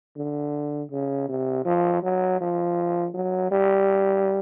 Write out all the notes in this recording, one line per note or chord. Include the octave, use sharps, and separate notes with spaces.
D3
C#3
C3
F3
F#3
F3
F#3
G3